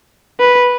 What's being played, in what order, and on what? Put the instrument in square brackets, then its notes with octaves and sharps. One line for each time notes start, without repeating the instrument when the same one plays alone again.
[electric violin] B4